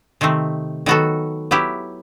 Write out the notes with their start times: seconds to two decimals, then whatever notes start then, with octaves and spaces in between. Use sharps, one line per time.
0.21 C3 D#3 A3 C4
0.86 D#3 F#3 B3 F#4 A4
1.51 F#3 B3 E4 G4